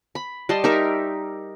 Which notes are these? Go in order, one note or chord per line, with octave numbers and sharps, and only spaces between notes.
B5
G3 D#5 A5 C6
D#4 G4 A#4 E5